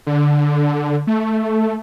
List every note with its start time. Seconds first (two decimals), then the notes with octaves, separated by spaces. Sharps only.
0.07 D3
1.07 A3